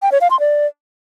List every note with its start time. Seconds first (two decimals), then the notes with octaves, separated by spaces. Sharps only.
0.02 G5
0.12 C#5
0.21 F5
0.31 C6
0.40 D5